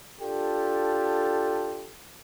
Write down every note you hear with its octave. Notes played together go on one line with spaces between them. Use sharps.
D4 F4 G4 A4